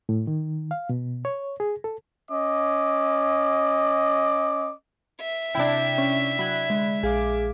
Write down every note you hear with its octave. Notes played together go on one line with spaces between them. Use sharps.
A2
D#3
F5
B2
C#5
G#4
A4
C#4 D#5 D6
E5
C3 D4 E4 G5
C#4
F#3 B5 F#6 G#6
D3 G#3
A#1 G#4 F5 D6